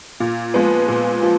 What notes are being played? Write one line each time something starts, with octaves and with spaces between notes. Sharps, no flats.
A#2
F3 G#3 B3
A#2
F3